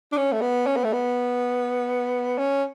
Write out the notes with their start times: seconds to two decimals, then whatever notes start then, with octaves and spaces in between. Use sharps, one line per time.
0.12 D4
0.17 C#4
0.32 A3
0.42 B3
0.66 C#4
0.76 B3
0.84 A3
0.93 B3
2.38 C#4